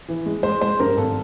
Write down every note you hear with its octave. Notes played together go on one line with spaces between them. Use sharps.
E3
G#3
G#3 C5
G#3 C5
G2 A#4
G#1 A4